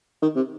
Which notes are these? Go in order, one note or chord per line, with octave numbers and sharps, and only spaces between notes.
D#3
C3